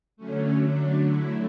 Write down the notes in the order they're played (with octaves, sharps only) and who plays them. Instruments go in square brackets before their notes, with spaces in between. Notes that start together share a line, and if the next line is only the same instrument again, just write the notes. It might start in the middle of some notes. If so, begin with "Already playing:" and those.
[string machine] D3 F#3 A3 C#4
D4
E4